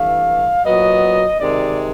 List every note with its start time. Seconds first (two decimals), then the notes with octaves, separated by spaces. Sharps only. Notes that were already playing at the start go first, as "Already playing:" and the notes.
Already playing: G2 E3 A3 F5
0.65 A#2 F#3 B3 D#5
1.40 C3 D#3 G#3 D5